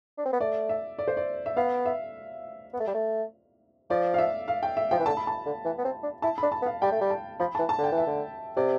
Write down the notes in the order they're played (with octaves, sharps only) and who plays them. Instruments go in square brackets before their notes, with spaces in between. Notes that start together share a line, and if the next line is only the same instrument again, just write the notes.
[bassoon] D4
C4
B3
[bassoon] A3 [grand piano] D5
[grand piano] E5
D5
C5
D5
E5
[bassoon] B3 [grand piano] F5
[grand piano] E5
[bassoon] B3
A3
G3
A3
[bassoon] F3 [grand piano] D5
[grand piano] F5
E5
F5
G5
E5
[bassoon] F3 [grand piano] G5
[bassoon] E3
[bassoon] D3 [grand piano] A5
[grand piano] B5
A5
[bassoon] D3
E3
B3
C4
D4
[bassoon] E4 [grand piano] A5
[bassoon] D4 [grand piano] B5
[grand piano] A5
[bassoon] B3
[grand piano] F5
[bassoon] G3 [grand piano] G5
[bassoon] A3
G3
[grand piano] A5
[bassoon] F3 [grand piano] B5
[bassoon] E3 [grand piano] A5
[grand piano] A5
[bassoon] D3
[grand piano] G5
[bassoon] E3
[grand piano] E5
[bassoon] D3
[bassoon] C3 [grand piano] D5